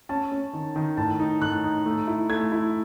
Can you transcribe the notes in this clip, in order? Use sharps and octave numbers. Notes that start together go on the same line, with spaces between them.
C#4 A5
C#4
D#3
D#3
A2 A5
D#4
A2 F#6
D#4
A3
E4
A3 G#6
E4